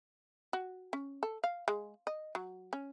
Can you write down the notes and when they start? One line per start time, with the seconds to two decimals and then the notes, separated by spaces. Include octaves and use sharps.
0.53 F#4
0.93 C#4
1.23 A4
1.44 F5
1.68 G#3
2.07 D#5
2.35 F#3
2.73 C#4